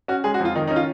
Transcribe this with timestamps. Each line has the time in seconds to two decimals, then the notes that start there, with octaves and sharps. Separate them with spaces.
0.08 C#4 F#4
0.24 G#3 G#4
0.34 F#4
0.40 F2
0.45 F4
0.55 D#3 D#4
0.67 C#4 D#4
0.76 F4